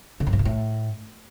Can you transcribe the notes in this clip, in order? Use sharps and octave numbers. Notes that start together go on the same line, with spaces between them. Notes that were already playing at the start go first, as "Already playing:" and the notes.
D3
F#2
G#2
A#2
A2